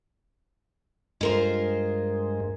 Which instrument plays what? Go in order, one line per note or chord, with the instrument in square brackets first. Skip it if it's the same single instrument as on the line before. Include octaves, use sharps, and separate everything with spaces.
[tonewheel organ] G2 G#3 [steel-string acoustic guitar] F4 A#4 C5